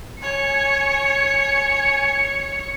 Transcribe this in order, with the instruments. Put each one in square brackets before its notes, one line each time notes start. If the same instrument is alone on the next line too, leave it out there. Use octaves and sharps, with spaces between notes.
[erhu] C#5 [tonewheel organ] G#5 [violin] C#7